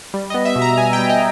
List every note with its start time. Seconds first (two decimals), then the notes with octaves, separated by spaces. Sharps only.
0.14 G3
0.30 D#5
0.34 B3
0.45 E5
0.56 B2
0.62 A#5
0.77 B2 G#5
0.93 G5
0.98 G3
1.10 D#5